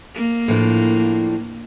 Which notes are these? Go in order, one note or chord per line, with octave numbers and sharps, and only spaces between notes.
A#3
A2 F3 D4